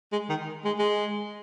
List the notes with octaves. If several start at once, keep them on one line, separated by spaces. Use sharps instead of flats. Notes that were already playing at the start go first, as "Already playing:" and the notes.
G#3
D#3
G#3
G#3